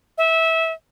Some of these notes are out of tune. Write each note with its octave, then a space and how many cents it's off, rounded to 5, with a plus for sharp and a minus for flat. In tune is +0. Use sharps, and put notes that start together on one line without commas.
E5 -20